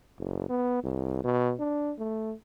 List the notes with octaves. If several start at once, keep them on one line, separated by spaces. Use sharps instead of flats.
F#1
B3
C2
B2
D4
A3